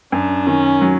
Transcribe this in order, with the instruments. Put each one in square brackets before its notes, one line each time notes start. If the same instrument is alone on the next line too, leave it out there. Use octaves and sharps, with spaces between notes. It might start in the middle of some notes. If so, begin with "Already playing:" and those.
[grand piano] F#2 [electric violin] D4
[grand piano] D#3 [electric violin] C#4
[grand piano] F#3